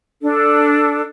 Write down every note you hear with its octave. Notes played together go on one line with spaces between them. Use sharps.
D4 A4